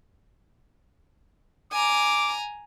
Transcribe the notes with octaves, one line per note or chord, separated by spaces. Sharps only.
G#5 A#5 D6